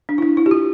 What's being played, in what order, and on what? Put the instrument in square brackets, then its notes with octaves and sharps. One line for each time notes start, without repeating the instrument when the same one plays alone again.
[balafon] D4
E4
D4
E4
G4
F4